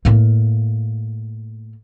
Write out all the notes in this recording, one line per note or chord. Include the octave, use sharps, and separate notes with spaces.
A2 A#3